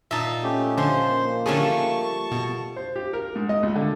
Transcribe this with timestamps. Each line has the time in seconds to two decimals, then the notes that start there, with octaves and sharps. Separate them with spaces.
0.11 A#2 D#4 E5 A5
0.44 A3 C#4 G4
0.78 D3 F3 C5 C6
1.10 A#3
1.46 D3 F3 G3 A3 C#4 G#4 A5 C#6
2.31 B2
2.76 C5
2.96 G4
3.13 A#4
3.36 G#2
3.49 D#5
3.63 C#2
3.76 D3